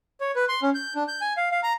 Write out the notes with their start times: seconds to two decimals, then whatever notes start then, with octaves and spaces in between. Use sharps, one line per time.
0.20 C#5
0.36 B4
0.48 C6
0.62 C#4
0.75 G6
0.95 D4
1.08 G6
1.21 G#5
1.37 F5
1.52 F5
1.63 A#5